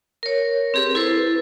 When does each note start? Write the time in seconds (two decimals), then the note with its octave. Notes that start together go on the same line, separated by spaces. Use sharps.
0.23 A#4 C#5
0.74 C4 G4 G#4 B4
0.95 E4 A4 B4 C5